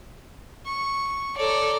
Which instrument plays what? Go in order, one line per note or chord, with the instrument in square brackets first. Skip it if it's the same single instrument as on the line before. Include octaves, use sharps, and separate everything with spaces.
[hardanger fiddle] C#6
[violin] A4 C#5 [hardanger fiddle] D5 A#5